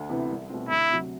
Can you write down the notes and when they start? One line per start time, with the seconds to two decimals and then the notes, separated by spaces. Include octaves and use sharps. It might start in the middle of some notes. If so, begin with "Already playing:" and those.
Already playing: D2
0.09 C3 E3 B3 E4
0.29 C2
0.50 B2 A3 C4
0.69 D2 E4
0.90 C3 F#3